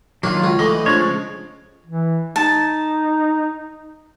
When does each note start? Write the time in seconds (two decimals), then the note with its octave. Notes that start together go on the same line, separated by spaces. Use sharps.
0.23 D#3 F#3 A#3 D4 F4
0.42 C#2 C#4
0.59 D3 E3 A3 D#5
0.86 F3 G#3 D4 C#5
0.99 C#3
1.86 E3
2.36 D#4 A5